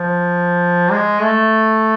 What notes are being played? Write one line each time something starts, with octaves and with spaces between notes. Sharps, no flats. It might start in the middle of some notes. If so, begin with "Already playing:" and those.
Already playing: F3
G#3
A3